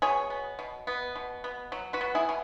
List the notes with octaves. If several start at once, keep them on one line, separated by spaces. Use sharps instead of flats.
B2 G#4 C#5
B3
B2
B3
B2
B3
F#3
F#4 B4
B3
E4 G#4
B2